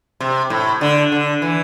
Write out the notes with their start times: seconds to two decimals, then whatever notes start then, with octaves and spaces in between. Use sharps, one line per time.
0.20 C3
0.50 A2
0.81 D3
1.12 D3
1.42 E3